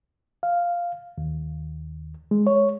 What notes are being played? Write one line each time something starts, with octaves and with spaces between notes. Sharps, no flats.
F5
D#2
G#3
C#5